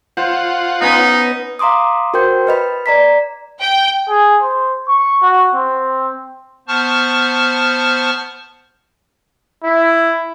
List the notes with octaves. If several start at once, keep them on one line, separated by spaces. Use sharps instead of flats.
F4 C5 F#5
B3 C#4 D#4
F5 A#5 C6 D6 D#6
F#4 A#4 C5 G5 C6 G6
B4 D#5 B5
D5 A#5 B6
G5
G#4
C5
C#6
F#4
C4
B3 C5 A5 C#6 F6
E4